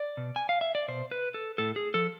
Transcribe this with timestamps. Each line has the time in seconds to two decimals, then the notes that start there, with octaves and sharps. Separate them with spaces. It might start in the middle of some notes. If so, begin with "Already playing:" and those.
Already playing: D5
0.17 B2
0.36 G#5
0.49 F5
0.61 E5
0.75 D5
0.88 B2 C5
1.11 B4
1.34 A4
1.58 A2 A4
1.76 G#4
1.94 F3 A4